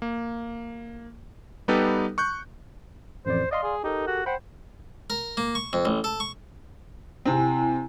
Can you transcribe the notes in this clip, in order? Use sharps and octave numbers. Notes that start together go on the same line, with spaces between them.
A#3
G3 B3 D#4 G4 A4 B4
C#6 F#6 G6
A1 F2 C5 D5
D5 D#5 F5 C6
G#4
D#4 G4 A4 A#4
F#4
C5 F#5 G5 B5
A#4
A#3
C#6
F2
A1
A4
C#6
C3 C4 E4 G#5